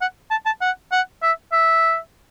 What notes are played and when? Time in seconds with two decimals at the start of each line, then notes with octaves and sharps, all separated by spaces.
0.01 F#5
0.31 A5
0.46 A5
0.61 F#5
0.92 F#5
1.22 E5
1.52 E5